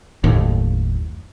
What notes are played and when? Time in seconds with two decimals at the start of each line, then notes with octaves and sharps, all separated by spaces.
0.24 F#1 D#2 A2